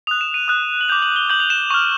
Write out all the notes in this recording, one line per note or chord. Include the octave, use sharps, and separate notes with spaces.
D#6 F#6 F7
E7
D#7
D#6 F#6
F#7
D6 G6 F7
F#7
G7
D6 G6 F#7
F7
E7
C#6 F6